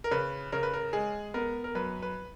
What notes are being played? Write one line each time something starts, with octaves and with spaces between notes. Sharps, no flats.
A#4
C#3 B4
C#3 A#4
B4
A#4
G#3 G#4
B3 A#4
A#4
F#2 B4
B4